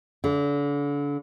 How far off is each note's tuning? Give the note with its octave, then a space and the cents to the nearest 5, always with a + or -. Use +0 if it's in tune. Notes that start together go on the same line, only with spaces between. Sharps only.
D3 -35